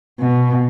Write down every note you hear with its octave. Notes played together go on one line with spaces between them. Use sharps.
B2